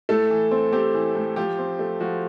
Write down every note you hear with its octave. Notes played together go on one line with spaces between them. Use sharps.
A2 A3 A4
E3
C4
C4 G4
E3
A2
F3 G4
C4
A3
F3 F#4